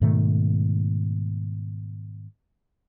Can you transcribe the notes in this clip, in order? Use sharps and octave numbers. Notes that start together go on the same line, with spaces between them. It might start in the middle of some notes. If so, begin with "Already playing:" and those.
G#2 B2 D#3 A3